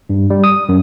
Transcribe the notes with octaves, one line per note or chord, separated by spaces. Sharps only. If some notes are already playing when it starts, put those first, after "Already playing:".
G2
G3
D#6
F#2